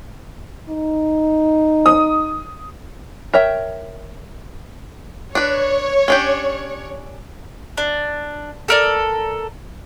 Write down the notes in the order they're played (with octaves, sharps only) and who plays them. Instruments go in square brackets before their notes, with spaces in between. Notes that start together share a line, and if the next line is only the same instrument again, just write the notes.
[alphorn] D#4
[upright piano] D#6
[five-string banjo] A#4 C#5 E5 G5
[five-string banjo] D4 B4 [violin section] C#5
[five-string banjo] C#4 D4 G4
[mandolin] D4
A4 A#4 D5